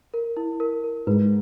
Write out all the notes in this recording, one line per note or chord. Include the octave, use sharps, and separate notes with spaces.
A#4
E4
A#4
A#4
G#2 B4